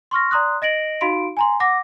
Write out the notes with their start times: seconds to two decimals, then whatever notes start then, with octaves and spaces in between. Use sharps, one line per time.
0.11 C6 C#6 F6 A#6
0.31 D5 A#5 C6 D#6 F#6
0.62 D#5 A#6 D7 F#7
1.01 D#4 F#4 F5 B5 C6 D7
1.37 G#5 A#5 C6
1.60 F#5 D6 A#6